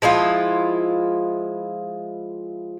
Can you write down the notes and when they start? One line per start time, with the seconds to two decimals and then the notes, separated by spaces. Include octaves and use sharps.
0.02 F3 G#3 E4 F4